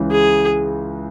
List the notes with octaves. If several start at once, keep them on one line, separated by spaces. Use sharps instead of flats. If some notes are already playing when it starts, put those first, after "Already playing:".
Already playing: C#2 C#3 E3
G#4